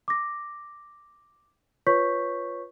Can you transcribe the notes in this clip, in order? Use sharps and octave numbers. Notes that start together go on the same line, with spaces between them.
D6 A#6
F4 B4 C#5 C#6 G6 B6